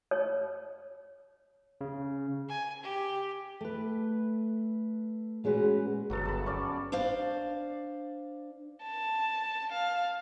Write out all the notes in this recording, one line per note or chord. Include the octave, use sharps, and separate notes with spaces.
C#5
C#3
G#5
G4
A3 B4
A#2 G#3 C#4 F#4 B4
G1 F#3 B3 A4
A5 B5
C#4 C#5 D5
D4 C5 D5 F5
A5
F5